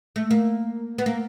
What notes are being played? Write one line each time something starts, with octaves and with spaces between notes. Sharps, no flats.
A3
A#3
B3
A#3